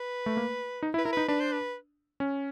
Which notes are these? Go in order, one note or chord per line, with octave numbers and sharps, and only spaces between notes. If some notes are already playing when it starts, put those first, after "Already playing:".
Already playing: B4
A3
A#3
D#4
E4
B4
E4 A#4
D#4 B4
D4 B4
C5
B4
C#4